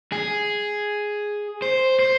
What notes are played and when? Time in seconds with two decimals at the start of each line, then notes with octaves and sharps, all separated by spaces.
0.12 G#4
1.62 C5
1.99 C5